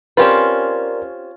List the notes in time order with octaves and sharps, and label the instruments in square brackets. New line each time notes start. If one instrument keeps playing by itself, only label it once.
[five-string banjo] C4 G4 B4 [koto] C#4 F4 [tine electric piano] A#4 D5